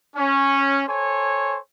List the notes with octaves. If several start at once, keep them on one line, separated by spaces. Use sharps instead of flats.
C#4
A4 C5 C#5 G#5